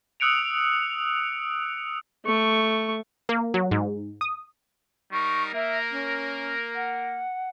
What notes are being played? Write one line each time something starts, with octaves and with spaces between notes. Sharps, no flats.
D#6 E6 F#6 C#7 D7 F7
A3 C#6
A#3
F#3
G#2
D#6
G3 D#4 A#4 C#6
A#3 A#4 E5
C#4
F#5